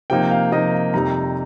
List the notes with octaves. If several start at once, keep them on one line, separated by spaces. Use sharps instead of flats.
C3 F3 A#3 D#4 G5
F5
C3 F3 A#3 D#4 D#5
F5
F2 C3 G3 D#4 A#5